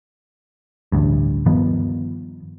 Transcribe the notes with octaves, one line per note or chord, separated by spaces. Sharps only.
A1 D2 G2
G2 D#3 F3 B3